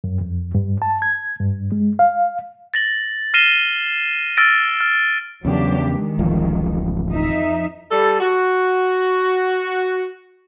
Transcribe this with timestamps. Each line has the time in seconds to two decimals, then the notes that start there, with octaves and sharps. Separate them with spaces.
0.04 F#2
0.21 F2
0.55 G2
0.82 A5
1.02 G#6
1.41 G2
1.72 G#3
1.99 F5
2.74 A6 A#6 F#7
3.34 F6 A#6 C7 D#7 E7 G7
4.37 E6 F6 A6 A#6 D7
4.81 F6
5.45 E2 C#3 F#3 D4 G4
5.89 D#3 G#3
6.19 D1 A1 F3
7.10 F2 D#4 E5
7.91 G3 A4
8.20 F#4